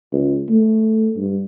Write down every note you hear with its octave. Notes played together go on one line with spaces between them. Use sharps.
C#2
A3
G2